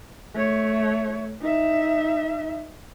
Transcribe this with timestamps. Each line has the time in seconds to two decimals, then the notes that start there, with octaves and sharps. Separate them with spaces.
0.34 A3 C#5
1.41 D#4 E5